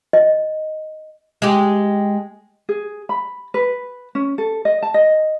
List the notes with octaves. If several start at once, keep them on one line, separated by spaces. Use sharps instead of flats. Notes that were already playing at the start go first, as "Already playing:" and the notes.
D#5
G#3 G4
G#4
B5
B4
C#4
A4
D#5
A5
D#5